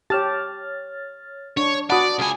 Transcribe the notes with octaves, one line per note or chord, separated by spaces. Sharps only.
G4 C#5 A5 F6 A6
D4 C#5
F#4 D5 F#5 A5 B5 D#6
C#2 G#5